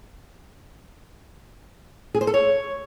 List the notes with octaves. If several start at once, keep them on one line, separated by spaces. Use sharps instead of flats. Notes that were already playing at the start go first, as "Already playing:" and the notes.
G#4
C5
A4
C#5